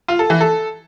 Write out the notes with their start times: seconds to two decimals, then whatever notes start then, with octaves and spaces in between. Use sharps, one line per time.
0.08 F4
0.19 A4
0.30 E3
0.41 A4